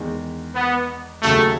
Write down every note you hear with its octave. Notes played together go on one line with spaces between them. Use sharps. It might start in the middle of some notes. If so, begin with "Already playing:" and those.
Already playing: E2 D#3 G#3
B3
D#2 C#3 F#3 A3